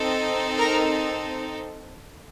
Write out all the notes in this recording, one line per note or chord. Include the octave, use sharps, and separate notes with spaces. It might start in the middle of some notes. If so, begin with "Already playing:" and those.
Already playing: C4 D#4 A4
A#4 A#5